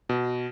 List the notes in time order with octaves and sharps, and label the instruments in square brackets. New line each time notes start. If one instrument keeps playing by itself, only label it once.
[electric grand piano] B2